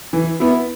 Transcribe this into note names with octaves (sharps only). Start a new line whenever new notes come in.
E3
B3 E4